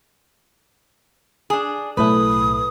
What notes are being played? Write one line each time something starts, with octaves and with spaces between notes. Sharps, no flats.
D4 G#4
B1 A2 A3 B4 D#6